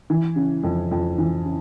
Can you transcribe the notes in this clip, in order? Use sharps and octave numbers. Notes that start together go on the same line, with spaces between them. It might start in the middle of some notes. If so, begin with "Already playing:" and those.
E3
C#3
F2
F2
E3
C#3